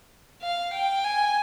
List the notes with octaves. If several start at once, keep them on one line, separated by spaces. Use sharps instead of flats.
F5
G5
G#5